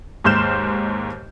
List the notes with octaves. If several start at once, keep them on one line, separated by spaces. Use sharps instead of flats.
D#2 G#2 C6 F6 G6 E7